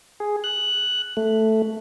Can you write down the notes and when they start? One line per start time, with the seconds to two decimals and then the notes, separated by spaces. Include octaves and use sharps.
0.20 G#4
0.44 F#6
1.17 A3